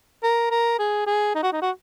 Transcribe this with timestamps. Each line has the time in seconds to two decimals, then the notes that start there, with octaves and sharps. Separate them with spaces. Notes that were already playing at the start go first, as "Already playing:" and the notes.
0.23 A#4
0.50 A#4
0.79 G#4
1.06 G#4
1.35 D#4
1.43 F#4
1.52 D#4
1.62 F#4